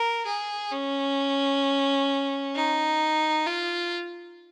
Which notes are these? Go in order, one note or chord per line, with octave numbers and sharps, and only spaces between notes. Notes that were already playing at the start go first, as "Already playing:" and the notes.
Already playing: A#4
G#4
C#4
D#4
F4